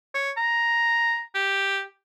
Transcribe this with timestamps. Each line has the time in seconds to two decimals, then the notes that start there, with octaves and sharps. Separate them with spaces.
0.15 C#5
0.37 A#5
1.35 G4